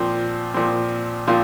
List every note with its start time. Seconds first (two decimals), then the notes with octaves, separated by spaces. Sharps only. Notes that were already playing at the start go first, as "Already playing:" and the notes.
Already playing: A#2 F3 C4
0.54 A#2 F3 C4
1.27 A#2 F3 C4 F4